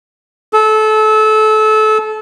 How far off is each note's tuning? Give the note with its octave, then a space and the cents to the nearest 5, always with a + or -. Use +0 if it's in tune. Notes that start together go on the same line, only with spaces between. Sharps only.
A4 -25